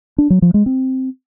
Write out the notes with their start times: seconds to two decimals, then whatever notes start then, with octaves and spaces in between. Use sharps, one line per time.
0.18 D4
0.30 F#3
0.42 F3
0.54 G#3
0.66 C4